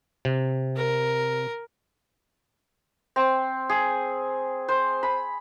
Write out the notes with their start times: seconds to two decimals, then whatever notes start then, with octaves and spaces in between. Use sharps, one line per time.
0.25 C3
0.76 A#4
3.16 C4
3.69 G#4
4.68 C5
5.03 B5